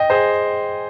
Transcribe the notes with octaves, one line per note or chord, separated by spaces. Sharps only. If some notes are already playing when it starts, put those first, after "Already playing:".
Already playing: D#5 G5
G#4 C5